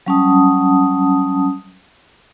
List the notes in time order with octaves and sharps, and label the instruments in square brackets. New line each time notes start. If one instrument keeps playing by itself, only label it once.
[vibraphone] F#3 G3 C#4 F#5 A5 D#6